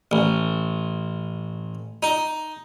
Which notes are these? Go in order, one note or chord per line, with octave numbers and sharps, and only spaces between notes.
A1
D#4